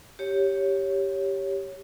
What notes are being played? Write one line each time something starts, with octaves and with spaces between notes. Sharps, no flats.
G4 C#5